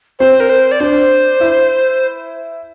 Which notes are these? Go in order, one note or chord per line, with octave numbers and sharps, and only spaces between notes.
C4 C5
A#4
C5
D5
D4 C5
E4